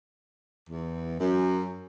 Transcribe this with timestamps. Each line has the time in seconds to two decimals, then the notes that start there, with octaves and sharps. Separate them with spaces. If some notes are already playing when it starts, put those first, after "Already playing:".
0.70 E2
1.19 F#2